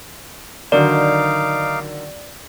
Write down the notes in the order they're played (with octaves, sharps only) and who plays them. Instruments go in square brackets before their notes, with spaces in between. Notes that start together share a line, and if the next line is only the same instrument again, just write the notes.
[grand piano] D3 D#3 F#3 [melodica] D#4 F5 D6 [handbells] D5